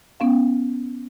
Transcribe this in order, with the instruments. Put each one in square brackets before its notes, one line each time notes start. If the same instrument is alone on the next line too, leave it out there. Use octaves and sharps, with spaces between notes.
[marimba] B3 C#4 F5